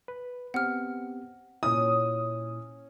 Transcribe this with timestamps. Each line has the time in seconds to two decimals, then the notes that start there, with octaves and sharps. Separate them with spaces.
0.08 B4
0.54 B3 C4 G4 F#5 F6
1.63 A#2 C#4 E4 D#6